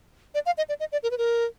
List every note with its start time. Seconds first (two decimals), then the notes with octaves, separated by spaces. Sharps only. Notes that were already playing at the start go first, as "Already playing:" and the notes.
0.34 D5
0.46 F5
0.58 D#5
0.69 D5
0.80 D#5
0.92 D5
1.03 A#4
1.11 B4
1.18 A#4